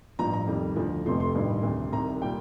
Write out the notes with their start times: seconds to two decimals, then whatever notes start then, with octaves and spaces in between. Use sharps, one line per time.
0.19 A1 G2 F3 A#5
0.33 A#5
0.47 F2 D#3 G3
0.76 D2 D3 F3
1.05 F1 F2 C3 F3 A3 C6
1.20 C6
1.35 A1 G2 D#3 G3
1.63 D2 C3 D#3
1.92 C2 C3 D#3 A#5
2.22 A#2 G3 G5